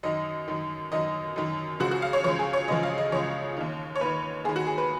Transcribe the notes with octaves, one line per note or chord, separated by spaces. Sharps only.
F#2 D#3 D#5
F#2 D#3
F#2 D#3 D#5
F#2 D#3
C#2 C#3 F3 F#4
F#4
F5
C#5
C#2 C#3 F3 C#5
G#4
C#5
C#2 C#3 F3 D#5
F5
D#5
C#2 C#3 F3 C#5
D#2 D#3
C#5
D#2 D#3 B4
D#2 D#3 G#4
F#4
G#4
B4